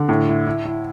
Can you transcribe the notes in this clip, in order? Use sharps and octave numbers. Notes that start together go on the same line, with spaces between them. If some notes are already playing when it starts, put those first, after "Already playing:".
Already playing: D3
A2
E4
E4
E4